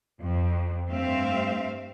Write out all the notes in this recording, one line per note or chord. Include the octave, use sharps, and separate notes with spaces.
F2
G2 A3 C4 E5 F5